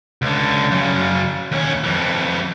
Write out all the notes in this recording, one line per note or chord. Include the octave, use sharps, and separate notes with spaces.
C#2 D3
F#2 C#3
D#2 C#4
F2 E3